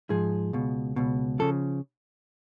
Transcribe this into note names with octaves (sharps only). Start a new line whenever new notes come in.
G#2 F3 G#4
C#2 B2
C#2 B2
C#3 F3 A4